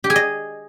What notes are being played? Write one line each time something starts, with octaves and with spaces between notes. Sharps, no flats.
G4
G#4
D#5